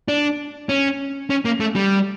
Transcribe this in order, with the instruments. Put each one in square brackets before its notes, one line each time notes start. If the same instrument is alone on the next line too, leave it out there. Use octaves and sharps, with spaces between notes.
[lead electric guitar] D4
C#4
C#4
A#3
A3
G3